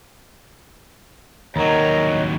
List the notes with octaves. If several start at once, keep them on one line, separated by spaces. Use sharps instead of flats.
D#2 F#3 D#4 A#4 C#5 A#5